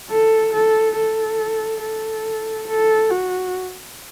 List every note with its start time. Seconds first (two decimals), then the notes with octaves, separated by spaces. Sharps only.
0.10 A4
0.53 A4
0.96 A4
1.82 A4
2.68 A4
3.10 F#4